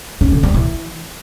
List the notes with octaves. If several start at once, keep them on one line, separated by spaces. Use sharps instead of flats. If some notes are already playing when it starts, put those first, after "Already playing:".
C#4
D3
G3
E3